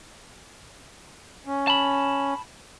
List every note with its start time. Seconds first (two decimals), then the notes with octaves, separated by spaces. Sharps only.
1.47 C#4
1.68 A5 B5